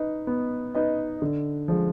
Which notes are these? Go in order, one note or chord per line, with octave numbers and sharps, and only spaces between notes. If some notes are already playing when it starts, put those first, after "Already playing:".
Already playing: D#4 B4 D#5
B3
D#4 B4 D#5
D3
F3 G#3